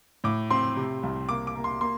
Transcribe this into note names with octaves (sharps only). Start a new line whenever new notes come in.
A2 D6
C4 C6
C3
C2
A#3 D6
D6
A#3
C6
A#3 C6